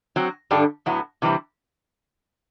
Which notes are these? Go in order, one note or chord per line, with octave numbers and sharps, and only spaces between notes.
F#3 C4 F#4
G2 D3 G3 D4 A4
A2 F#3 B3 E4
C3 E3 G3 C4 E4